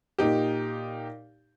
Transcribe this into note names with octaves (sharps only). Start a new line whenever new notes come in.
A#2 D#4 G4